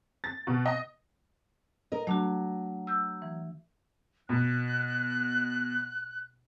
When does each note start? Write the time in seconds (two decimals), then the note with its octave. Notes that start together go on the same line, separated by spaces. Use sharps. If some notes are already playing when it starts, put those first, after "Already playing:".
0.24 A6
0.47 B2
0.66 D#5
1.92 A#4 D#5
2.07 F#3 A3 D4 F#4
2.87 E6 G6
3.22 E3
4.29 B2 F#6